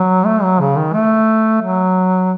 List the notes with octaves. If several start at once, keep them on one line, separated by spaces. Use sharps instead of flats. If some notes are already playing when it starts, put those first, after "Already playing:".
Already playing: F#3
A3
F#3
C#3
D#3
A3
F#3